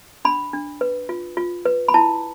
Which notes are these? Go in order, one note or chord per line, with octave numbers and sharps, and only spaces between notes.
D4 B5
D4
B4
F4
F4
B4
B5
E4 A5